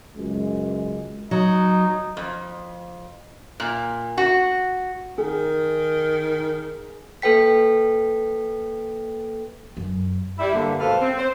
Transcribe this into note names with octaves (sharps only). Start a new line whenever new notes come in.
C#2 F#2 G#3
F#3 D#4
F2
A#2
F#4
D#3 G#4
A#3 A4 B4 G5 B6
F#2
G3 E4
G2 D3 A#3
G#2 B2 A4 B4 C5 F5
C4
C5